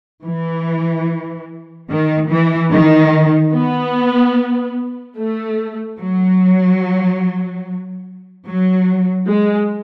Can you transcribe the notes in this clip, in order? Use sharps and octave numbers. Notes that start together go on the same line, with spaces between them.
E3
D#3
E3
D#3
B3
A3
F#3
F#3
G#3